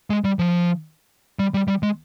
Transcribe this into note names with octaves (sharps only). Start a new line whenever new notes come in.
G#3
G3
F3
G3
G3
G3
G#3